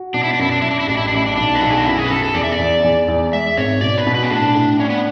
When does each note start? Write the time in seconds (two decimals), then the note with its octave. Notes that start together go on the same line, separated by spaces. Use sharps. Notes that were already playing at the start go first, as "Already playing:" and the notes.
Already playing: F#4
0.14 B2 D4
0.24 E4
0.33 D4
0.39 F#2 E4
0.52 D4
0.62 F#2 E4
0.71 D4
0.80 E4
0.87 A1 D4
0.98 E4
1.08 D4
1.13 A1 E4
1.26 D4
1.36 B1 D4
1.55 B4
1.61 B1 A4
1.70 G#4
1.78 F#4
1.86 F#2 E4
1.98 G#4
2.04 B4
2.10 F#2 A4
2.23 A4
2.34 E2 D5
2.44 E5
2.52 D5
2.59 E2
2.84 E2
3.08 E2
3.33 G#3 E5
3.57 G#1 C#5
3.81 B2 D5
3.98 B4
4.07 B2
4.15 B4
4.23 C#4
4.30 A2 D4
4.55 A2
4.79 C#4 D4
4.90 B3